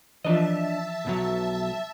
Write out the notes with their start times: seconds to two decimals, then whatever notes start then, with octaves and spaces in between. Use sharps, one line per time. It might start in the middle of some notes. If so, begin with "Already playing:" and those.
0.25 E3 F3 D4 F4 D#5 E5 A5
1.05 B1 B2 F#3